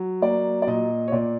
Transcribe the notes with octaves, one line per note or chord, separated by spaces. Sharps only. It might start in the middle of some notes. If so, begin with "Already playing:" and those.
Already playing: F#3
A#3 D5
D5
A#2 D#5
C#5
A#2 D5